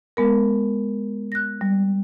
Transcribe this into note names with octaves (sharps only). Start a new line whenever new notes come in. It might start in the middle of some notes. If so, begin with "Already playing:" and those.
G#3 B3 A#4
F#6 A#6
G3